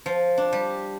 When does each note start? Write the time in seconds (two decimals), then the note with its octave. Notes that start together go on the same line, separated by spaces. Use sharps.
0.06 F3
0.38 D4
0.53 G3